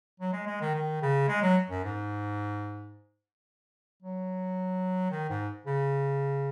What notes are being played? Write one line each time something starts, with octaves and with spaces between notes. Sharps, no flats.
F#3
G#3
G#3
D#3
D#3
C#3
G#3
F#3
F#2
G#2
F#3
D#3
G#2
C#3